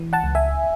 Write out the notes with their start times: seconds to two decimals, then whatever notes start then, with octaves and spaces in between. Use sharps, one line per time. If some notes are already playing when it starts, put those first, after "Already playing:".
Already playing: E3
0.13 F#5 A5
0.24 C#2
0.35 E5 G#5